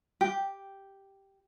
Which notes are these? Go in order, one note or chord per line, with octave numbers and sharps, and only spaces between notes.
G4